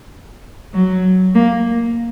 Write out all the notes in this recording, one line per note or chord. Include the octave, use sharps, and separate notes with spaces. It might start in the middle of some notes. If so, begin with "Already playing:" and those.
F#3
A#3